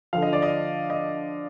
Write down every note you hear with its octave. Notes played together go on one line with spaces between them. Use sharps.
D3 F3 F5
D#5
D5
D#5
D#5